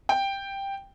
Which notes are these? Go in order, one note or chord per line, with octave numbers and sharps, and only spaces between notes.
G5